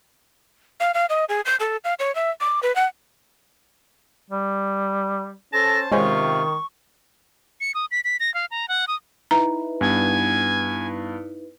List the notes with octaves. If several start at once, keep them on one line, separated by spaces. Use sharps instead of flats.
F5
F5
D#5
G#4
G6
A4
F5
C#5
E5
D6
B4
F#5
G3
C#4 A4 C5 A5 A#6
C3 D#3 G#3 C#4 F4 C5 C#6
C#7
D#6
B6
B6
A#6
F5
A#5
F#5
D#6
D#4 E4 B4 A#5
G2 B3 G#5